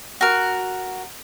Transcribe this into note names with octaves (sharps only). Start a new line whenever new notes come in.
F#4 A#4